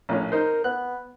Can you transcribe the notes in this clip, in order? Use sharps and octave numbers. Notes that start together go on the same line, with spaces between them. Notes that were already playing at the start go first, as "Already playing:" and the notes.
A#1 A2 C#4
D#4 A#4 C5
B3 F#6